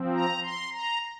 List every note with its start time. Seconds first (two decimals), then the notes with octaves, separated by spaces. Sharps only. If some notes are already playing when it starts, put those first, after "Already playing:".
Already playing: F3 C4
0.13 A#5
0.43 C6
0.73 A#5